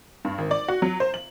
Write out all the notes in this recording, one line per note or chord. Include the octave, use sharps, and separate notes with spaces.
G2
G#1
D5
F#4
F#3
C5
F#7